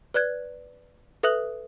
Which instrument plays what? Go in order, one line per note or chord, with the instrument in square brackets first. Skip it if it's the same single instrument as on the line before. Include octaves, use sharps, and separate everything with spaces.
[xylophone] B4 D5 F#6 G#6
A4 B4 E5 D#6 F#6 F#7